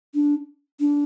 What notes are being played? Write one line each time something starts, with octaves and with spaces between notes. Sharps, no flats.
D4
D4